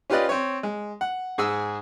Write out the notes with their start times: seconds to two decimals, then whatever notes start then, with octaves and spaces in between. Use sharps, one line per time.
0.10 C#4 F4 G4 B4 D5 D#5
0.29 C4 C#5
0.63 G#3
1.01 F#5
1.38 G#2 G#4 G#5 E6